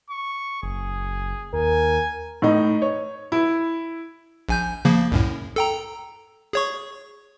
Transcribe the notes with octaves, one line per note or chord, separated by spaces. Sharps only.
C#6
F#1 G#4
D#2 A#4 G#5
A2 D#4
C#5
E4
A#1 G#5 G6
C#3 F3 A#3
C2 F#2 A2
A4 G5 A#5
G#4 C#5 C#6